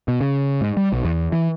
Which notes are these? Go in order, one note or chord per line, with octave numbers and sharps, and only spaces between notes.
B2
C#3
G#2
G3
B1
E2
E3